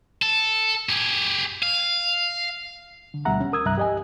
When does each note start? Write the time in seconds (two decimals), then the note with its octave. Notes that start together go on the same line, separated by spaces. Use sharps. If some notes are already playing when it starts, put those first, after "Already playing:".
0.22 A4
0.89 G4 G#4
1.63 F5
3.14 D3
3.25 D2 B2 G3 E5 F#5 A#5
3.41 C#4
3.53 A#4 D#6 E6 G#6
3.66 C2 G2 E5 A#5 F#6
3.78 G4 D#5 G#5